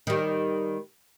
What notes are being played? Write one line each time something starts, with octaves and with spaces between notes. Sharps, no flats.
D#3 G3